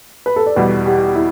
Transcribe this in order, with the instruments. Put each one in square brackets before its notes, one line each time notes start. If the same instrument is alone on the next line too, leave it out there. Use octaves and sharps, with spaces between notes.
[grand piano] B4
A4
D5
[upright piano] E2 B2 G3 [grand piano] B4
[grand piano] G4
E4